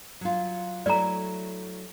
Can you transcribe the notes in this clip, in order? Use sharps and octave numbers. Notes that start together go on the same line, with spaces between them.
F#3 F4
F#3 A3 E4 D5 A#5